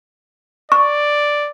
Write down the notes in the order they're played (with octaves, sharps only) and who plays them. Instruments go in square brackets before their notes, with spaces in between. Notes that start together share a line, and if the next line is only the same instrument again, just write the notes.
[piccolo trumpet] D5 [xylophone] C#6